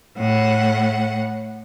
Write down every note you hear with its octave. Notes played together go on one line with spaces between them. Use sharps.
A2 F#5